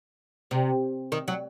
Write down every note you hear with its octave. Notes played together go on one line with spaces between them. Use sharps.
C3
D#3
F#3